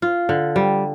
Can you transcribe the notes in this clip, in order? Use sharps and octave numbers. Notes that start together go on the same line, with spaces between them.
F4
D3
G3